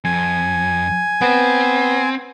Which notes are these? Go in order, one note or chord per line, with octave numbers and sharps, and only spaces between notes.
F2 G#5
B3 C4